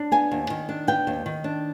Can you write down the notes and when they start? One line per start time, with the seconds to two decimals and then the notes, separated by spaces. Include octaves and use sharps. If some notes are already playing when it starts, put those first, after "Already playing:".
Already playing: D4
0.12 B3 G#5
0.31 D#2
0.50 D#3
0.69 D4
0.87 B3 G5
1.07 D#2
1.26 D#3
1.44 D4